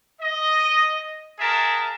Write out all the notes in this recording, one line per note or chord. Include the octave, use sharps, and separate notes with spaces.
D#5
F#4 G#4 A#4 E5 A5